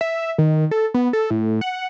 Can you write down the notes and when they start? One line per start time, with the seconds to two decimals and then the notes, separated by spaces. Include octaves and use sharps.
0.01 E5
0.38 D#3
0.71 A4
0.94 B3
1.13 A4
1.30 A2
1.61 F#5